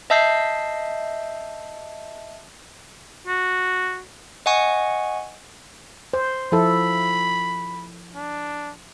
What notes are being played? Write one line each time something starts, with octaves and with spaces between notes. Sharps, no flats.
D#5 E5 A5 E6 G6 C7
F#4
D#5 F#5 G#5 C#6
C5
F3 E4 A4 B5
D4